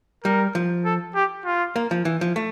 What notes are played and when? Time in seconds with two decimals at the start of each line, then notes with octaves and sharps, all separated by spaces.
0.24 G3 A#4
0.55 F3
0.85 A4
1.15 G4
1.45 F4
1.76 A#3
1.91 F3
2.05 E3
2.21 F3
2.36 A3